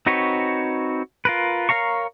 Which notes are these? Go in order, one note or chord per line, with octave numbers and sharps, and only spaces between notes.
C4 D#4 F#4 B4 C#5
F4 A#4 B4
A#4 C#5 F5 A#5 C#6